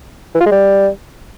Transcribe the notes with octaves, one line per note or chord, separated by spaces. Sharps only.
E3
F4
G#3
G3